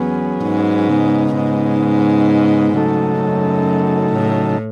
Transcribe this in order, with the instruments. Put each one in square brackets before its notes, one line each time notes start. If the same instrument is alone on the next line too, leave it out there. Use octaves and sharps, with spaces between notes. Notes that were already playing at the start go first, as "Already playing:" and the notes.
Already playing: [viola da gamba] E2 [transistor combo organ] F#3 C#4 G#4 B4
[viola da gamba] G#2
[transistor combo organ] C#3 G#3 B3 D#4
[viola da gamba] G#2
[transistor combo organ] C#3 F#3 A3 D#4 A4
[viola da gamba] F#2
A2